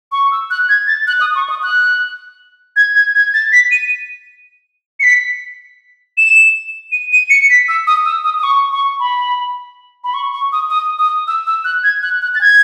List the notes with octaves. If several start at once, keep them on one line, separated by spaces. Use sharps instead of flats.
C#6
E6
F#6
G#6
A6
F#6
D#6
C#6
D#6
F#6
G#6
G#6
G#6
A6
B6
D#7
C#7
B6
E7
D#7
D#7
C#7
B6
E6
D#6
E6
D#6
D#6
C#6
C#6
B5
B5
C#6
C#6
D#6
D#6
D#6
E6
E6
F#6
G#6
F#6
F#6
A6
G#6